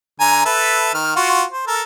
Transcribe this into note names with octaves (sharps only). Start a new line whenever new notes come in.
D3 G#5 A#5
A4 B4 E5
D#3 F6
F4 F#4
C5
A4 A#4